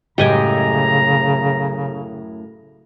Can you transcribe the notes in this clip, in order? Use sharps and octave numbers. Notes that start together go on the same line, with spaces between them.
F#2 A2 C#3 G#3 G4 D#5 G#5 A#5